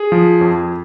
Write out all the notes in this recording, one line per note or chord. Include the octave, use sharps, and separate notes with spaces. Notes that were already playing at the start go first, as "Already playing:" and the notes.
Already playing: G#4
F3
F2